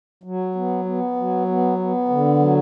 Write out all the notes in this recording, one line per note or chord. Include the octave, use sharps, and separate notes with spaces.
F#3
B3
B3
F#3
B3
B3
D3
F#3